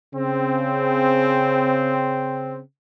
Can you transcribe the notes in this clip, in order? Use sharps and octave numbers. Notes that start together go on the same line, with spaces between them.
C#3 C4